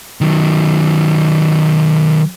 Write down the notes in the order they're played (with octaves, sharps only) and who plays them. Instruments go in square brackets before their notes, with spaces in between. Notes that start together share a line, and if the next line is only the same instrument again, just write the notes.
[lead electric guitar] D#3 F#3